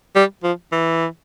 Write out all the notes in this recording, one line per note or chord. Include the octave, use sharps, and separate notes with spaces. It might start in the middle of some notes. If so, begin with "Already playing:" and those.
G3
F3
E3